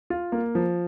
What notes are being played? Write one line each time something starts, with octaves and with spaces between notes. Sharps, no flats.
F4
A#3
F3